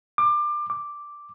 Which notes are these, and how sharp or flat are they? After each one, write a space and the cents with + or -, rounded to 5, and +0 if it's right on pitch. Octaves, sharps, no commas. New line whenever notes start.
D6 +25
D6 +0